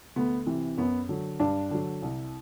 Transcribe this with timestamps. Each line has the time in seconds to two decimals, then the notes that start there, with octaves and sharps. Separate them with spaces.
0.16 D2 B3
0.47 C3 E3
0.77 F#2 B3
1.09 D3 F#3
1.40 G2 D4
1.71 D3 F#3
2.02 C2